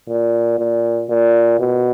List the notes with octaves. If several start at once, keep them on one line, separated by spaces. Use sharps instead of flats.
A#2
A#2
A#2
B2